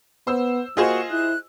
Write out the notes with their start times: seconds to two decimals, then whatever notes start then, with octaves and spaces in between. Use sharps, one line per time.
0.27 B3 C5 E6
0.77 A#3 F4 F#4 G#4 C5 D#5
1.11 E4 F#6